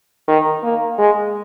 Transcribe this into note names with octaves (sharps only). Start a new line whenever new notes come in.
D#3
A#3
G#3